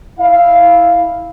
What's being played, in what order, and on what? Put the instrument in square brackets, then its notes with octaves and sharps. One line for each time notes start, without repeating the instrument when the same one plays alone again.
[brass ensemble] E4 F5